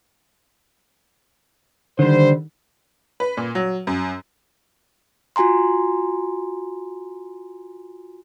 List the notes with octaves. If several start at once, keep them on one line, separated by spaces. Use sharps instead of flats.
D3 D#3 G3 C5
B4
A#2
F#3
F#2
F4 F#4 G#5 A#5 C6